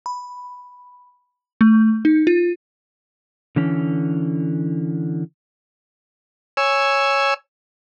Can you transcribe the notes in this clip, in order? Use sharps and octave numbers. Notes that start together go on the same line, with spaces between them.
B5
A3
D#4
F4
D3 E3 C#4
C#5 G#5 E6